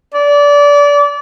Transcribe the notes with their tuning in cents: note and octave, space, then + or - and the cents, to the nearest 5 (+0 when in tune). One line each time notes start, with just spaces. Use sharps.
D5 -25